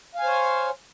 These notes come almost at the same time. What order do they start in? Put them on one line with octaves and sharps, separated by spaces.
F5 G#5 C5 C#5